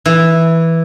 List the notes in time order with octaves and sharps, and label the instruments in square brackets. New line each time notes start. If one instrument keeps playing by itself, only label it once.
[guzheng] E3